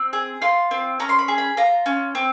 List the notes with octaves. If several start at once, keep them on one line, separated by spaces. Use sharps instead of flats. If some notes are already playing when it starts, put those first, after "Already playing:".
Already playing: C4
G#4
F4 C6
C4
C#4 A#5
C6
B5
G#4
B5
F4 A#5
C#4
C4